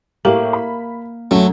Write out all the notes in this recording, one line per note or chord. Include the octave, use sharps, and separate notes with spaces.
A2 A#3 G4 F#7
B5
F#2 F#3 A3